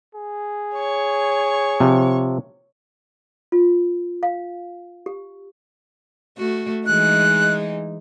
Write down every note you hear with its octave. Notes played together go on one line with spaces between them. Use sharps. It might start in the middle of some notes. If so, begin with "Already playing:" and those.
G#4
C#5 C#6
C3 F3
F4
F5
G4
A3 F#4
E3 G#3 D#4 F#6